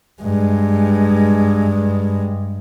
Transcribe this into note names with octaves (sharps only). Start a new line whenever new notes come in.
G2 G#3